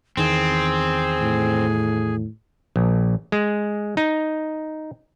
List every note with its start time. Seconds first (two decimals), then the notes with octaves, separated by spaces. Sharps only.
0.17 E2 D#3 E3 C4 G#4
1.21 A2
2.76 A#1
3.32 G#3
3.97 D#4